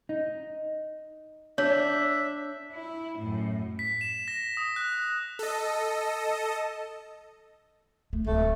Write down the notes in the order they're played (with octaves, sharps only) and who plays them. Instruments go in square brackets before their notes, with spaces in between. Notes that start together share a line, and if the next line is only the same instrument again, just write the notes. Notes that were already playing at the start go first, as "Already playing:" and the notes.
[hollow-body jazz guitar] D#4
[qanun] D4 [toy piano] C#5 [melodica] E5
[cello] E4
F#2 A2
[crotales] B6
E7
A#6
D#6
F#6
[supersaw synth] A4 D#5
[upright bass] A3
[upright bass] D1 G#3 [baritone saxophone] A3